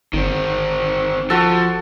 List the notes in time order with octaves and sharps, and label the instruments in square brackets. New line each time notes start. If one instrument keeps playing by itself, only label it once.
[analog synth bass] G1 [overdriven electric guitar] D#3 C4
[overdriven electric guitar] F3 [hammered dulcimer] F#4 A4